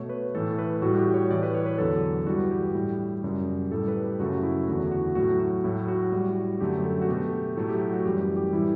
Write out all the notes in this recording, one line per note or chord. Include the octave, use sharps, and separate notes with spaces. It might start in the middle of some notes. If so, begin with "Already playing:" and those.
Already playing: B2 A3 C#5
B4
A2 E3 A3 A4
B4
A2 G3 F#4
G4
C#5
A2 E3 A3 D5
B4
C#5
B4
E2 D3 F#3 A4
G2 E3 G3 F#4
G4
A2 G3
F#2 C#3 G3
A2 G3 A4
B4
G4
F#2 C#3 F#3 A3 F#4
E4
E2 D3 A3 F#4
F#4
A2 F#3 A3 F#4
F#4
A2 F#3 A3 E4
F#4
A2 G3
F#2 D3 F#3 A3 G4
A4
F#4
B2 A3 G4
A2 F#3 A3 A4
G4
F#4
F#4
F#2 E3 G3 G4
G4
G4
A2 E3 G3 E4